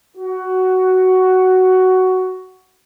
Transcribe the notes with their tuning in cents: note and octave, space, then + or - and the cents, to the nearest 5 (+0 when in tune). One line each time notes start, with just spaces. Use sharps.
F#4 +10